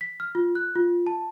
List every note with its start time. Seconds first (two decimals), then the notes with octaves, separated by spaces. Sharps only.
0.01 B6
0.20 F6
0.35 F4
0.55 F#6
0.76 F4
1.07 A5